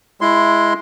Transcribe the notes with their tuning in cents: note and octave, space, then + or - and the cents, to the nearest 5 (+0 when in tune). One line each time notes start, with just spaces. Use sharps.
G#3 +0 E4 +15 C6 +0